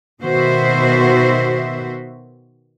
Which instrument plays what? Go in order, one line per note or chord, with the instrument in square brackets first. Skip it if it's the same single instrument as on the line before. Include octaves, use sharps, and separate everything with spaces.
[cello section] B2 D#3 B3 F#4 C5 E5